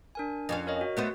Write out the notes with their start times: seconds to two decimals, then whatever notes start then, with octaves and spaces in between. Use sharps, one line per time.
0.15 D4 A#4 G#5
0.49 F2 C#4 F5
0.67 A#4 C#5 D#5
0.81 F#4
0.97 A3 B3 C4